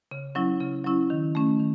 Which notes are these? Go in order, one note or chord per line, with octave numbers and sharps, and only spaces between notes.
C#3
F#3 C#4 E4
C#3
F#3 C#4 E4
D#3
A3 C#4
D#3